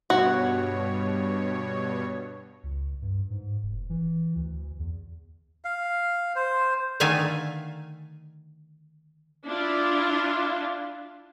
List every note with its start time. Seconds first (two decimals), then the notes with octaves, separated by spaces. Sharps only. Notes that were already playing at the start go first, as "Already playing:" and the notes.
0.10 G2 B2 F#4 C#5
2.63 C#2
3.02 G2
3.30 G#2
3.63 F1
3.90 E3
4.36 D2
4.79 E2
5.65 F5
6.35 C5
7.00 D3 D#3 A3 E5 F5 G#5
9.45 D4 E4 F4